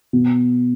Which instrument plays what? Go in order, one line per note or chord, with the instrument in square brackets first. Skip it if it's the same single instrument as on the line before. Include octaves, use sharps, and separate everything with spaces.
[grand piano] B2